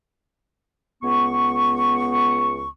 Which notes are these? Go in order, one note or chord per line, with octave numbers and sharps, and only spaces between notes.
C#2 B3 C#6